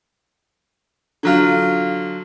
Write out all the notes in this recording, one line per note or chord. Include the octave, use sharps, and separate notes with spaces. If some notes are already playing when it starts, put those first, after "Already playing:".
D3 F#3 F4